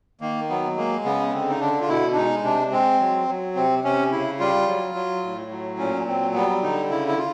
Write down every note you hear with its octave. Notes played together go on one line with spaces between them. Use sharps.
D#3 A#3
F#3 B3
G#3 A#3
C#3 B3
B3
D3 C4
D#4
D3 D4
F4
B2 E4
D4
G#3 D#4
C3 D4
G#3 C4
F#3
F#3
C3 C4
C3 C#4
C#3 E4
G3 F4
F#3
F#3
A2
F#3
A#2 C#4
F#3 C4
G3 B3
D3 D#4
C#3 E4
E4
F4